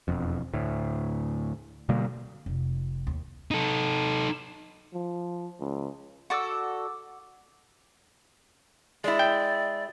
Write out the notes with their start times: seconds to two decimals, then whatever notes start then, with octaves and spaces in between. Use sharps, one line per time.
0.08 E1 F2
0.54 D2 A2
1.89 B2 D3 G3 A#3
2.46 F1
3.07 D#2
3.51 D#4 A4
4.94 F3
5.60 C#2
6.30 F#4 A4 D5 F#5 D6 E6
9.04 G#3 E4 D5
9.19 G5